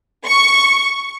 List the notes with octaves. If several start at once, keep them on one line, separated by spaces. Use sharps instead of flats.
C#6